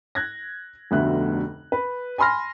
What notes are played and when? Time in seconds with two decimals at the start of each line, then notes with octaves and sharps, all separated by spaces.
0.15 F#6 G#6 A#6
0.91 F1 D2 B2 D3 E5 F#6
1.72 B4
2.18 G#5 B5 C6 F6 A#6